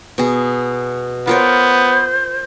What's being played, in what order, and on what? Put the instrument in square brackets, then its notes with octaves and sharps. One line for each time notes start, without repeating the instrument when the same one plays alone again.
[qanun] B2 G#4
[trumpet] B3 [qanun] F4 A#4 C#5 [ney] C5